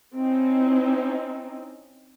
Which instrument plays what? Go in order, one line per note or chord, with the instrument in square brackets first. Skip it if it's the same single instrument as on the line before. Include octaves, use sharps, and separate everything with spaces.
[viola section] C4 C#4 D#4 E4